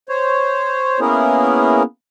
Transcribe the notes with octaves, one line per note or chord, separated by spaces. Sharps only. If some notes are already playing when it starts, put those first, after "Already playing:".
C5 C#5
A#3 B3 C#4 E4 G#4 A#4